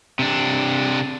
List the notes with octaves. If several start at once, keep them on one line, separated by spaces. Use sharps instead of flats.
C3 D4